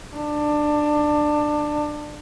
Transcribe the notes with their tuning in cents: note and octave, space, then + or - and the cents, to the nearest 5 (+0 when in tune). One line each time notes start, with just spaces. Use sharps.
D4 +20